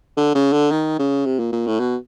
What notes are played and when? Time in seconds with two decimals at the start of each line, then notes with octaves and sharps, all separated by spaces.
0.17 D3
0.35 C#3
0.53 D3
0.71 D#3
0.99 C#3
1.26 C3
1.39 A#2
1.52 A#2
1.67 A2
1.80 B2